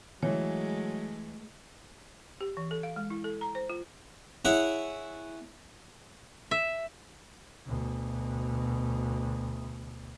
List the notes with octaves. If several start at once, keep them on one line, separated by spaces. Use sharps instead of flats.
E3 F#3 G#3 A3 C#5
G4
E3
A4
F5
G#3
E4
A4
A#5
C5
F4
E4 G#4 C#5 E5 F#5
E5
D2 B2